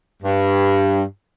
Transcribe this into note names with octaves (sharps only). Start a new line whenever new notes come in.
G2